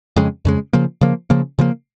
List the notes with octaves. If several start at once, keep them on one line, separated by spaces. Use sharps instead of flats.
F2 C#3 G#3
F2 C#3 G#3
C#3 F3 A#3
C#3 F3 A#3
C#3 F3 A#3
C#3 F3 A#3